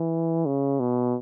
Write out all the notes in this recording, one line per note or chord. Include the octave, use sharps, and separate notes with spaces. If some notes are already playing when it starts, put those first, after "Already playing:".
Already playing: E3
C#3
B2